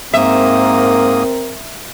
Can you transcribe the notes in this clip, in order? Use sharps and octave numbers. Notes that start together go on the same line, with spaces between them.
G#2 A#3 C4 A#4 E5 D#6